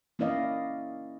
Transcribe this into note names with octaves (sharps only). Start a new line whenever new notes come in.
A#3 C#4 E4 D5 D#5 F5